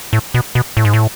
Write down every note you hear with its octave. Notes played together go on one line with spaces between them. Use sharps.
A2
B2
B2
A2
G#2
A2